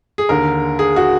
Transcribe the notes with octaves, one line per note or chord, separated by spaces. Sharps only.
G#4
D#2 D3 A#4
G#4
F#4